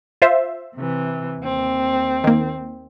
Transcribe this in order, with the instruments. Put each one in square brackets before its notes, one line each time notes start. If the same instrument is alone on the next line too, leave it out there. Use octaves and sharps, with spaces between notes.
[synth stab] F4 C5 E5
[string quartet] C3 E3
D#2 C4
[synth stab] D#3 A#3